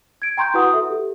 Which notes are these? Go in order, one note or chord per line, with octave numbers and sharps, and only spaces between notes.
G#6 D7
G5 A#5 C6 C#6 G6
E4 F#4 B4 F#5 D#6
A4 E5
G4